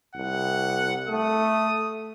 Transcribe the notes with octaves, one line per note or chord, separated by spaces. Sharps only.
C2 F#5
A3 D#6